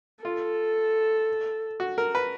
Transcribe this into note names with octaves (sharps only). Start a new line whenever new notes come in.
F4 A4
F#4
A#4
B4